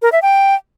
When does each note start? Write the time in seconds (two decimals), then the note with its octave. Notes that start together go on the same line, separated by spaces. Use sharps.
0.02 A#4
0.12 E5
0.22 G5